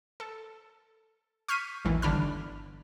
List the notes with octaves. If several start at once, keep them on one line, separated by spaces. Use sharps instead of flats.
A4
C#6 F6 G6 B6 C7 D#7
A1 D#2 E3
G1 D3 D4 B5 F6